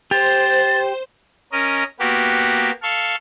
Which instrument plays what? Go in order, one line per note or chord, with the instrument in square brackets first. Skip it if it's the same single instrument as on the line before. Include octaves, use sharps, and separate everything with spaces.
[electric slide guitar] G4 [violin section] C5 [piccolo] A6
[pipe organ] C#4 A#4 D#5
A#3 B3 F#4 G4
A4 F5 C#6